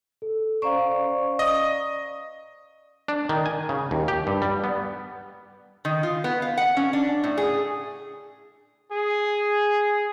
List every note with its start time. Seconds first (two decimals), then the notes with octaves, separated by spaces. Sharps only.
0.22 A4
0.62 C#4 C5 D5 F5 A#5 C#6
1.39 D5 D#5 D#6
3.08 D4
3.29 D#3
3.46 G#5
3.69 C#3
3.91 D#2
4.08 G4
4.27 G2
4.42 G3
4.64 B3
5.85 D#3
6.03 F4
6.24 B3
6.42 F5
6.57 F#5
6.77 C#4
6.93 D4
7.24 A2
7.37 G#4
8.92 G#4